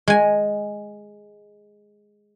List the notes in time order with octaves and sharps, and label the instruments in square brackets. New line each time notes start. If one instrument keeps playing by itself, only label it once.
[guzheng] G#3 G#5